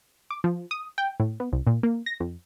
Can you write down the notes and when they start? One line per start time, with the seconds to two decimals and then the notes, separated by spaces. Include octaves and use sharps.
0.31 D6
0.44 F3
0.71 D#6
0.98 G5
1.20 A2
1.40 B3
1.52 C2
1.67 A#2
1.83 A#3
2.06 A#6
2.20 F2